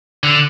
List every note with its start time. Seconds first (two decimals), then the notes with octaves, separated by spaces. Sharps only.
0.23 D3